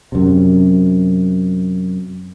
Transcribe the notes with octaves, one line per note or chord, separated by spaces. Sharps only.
F#2 C3